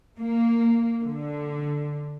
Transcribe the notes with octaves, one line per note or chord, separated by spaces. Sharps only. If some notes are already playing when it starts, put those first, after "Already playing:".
A#3
D3